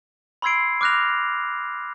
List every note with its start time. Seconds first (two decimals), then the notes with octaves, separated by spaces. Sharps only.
0.42 B5 C6 E6 G#6 C7 D7
0.81 D6 F6 F#6 A#6 F7